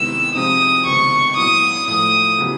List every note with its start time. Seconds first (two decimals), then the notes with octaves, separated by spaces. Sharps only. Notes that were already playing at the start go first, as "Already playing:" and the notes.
Already playing: C3 D#3 G#3 B3 E4 E6
0.35 C3 F3 G#3 C4 D#4 D#6
0.85 C#2 C3 D#3 G#3 B3 C#6
1.37 A#2 F#3 B3 E4 D#6
1.87 A2 F3 A3 D#6
2.38 C#3 F#3 B3 E4 G4